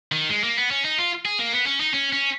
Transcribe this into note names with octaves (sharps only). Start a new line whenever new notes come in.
D#3
G#3
A#3
B3
C#4
D#4
F4
G#4
A#3
B3
C#4
D#4
C#4
C#4